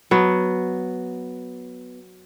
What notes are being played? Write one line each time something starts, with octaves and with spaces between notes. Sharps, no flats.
F#3 B3